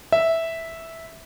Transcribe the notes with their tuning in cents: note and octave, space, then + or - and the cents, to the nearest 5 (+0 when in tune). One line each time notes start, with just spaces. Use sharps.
E5 -5